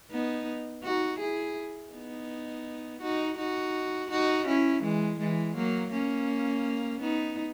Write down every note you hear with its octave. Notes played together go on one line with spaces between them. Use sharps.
B3 D#4
D#4 F#4
E4 G#4
B3 D#4
D#4 F#4
D#4 F#4
D#4 F#4
C#4 E4
E3 G#3
E3 G#3
F#3 A#3
A#3 C#4
B3 D#4